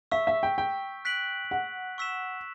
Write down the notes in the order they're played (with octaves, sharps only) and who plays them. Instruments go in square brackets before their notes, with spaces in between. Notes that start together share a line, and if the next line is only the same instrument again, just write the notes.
[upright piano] E5 [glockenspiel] C#6 E6 B6
[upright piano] E5
G5
G5
[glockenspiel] F#6 B6 D7 F#7
[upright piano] F#5
[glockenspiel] C#6 E6 B6 E7